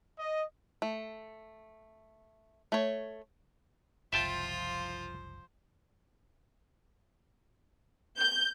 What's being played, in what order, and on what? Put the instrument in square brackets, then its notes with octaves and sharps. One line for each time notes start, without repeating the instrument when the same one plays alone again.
[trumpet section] D#5
[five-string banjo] A3
A3 C#5
[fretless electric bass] F#1 C2 [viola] F3 C5 [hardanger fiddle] F4 [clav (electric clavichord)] E5 G5 A5
[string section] G6